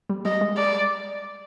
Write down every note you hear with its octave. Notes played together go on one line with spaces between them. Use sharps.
G3
G3 D#5
G#3
D5